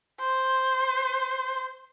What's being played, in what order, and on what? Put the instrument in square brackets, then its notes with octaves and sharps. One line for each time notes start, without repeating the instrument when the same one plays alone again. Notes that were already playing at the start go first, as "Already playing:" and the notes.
[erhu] C5